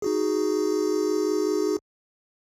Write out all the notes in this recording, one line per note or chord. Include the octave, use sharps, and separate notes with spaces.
D#4 F#4 G#4